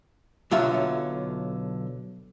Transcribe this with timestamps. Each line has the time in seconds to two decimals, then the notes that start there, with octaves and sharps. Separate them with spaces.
0.51 B1 D3 F#3 F4 C#5 E5